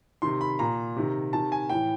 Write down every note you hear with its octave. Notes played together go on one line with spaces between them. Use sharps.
C3 D#3 C6
B5
A#2 A#5
C3 D#3
C3 D#3 A5
G#5
A2 E3 G5